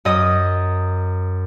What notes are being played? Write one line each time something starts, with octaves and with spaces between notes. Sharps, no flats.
F#2 D#5 D#6